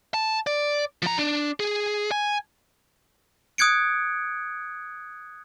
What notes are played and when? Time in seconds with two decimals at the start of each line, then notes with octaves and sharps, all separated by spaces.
0.14 A5
0.47 D5
1.02 F3 A#5
1.18 D4
1.60 G#4
2.11 G#5
3.58 D#6 F#6 G#6 C#7 D7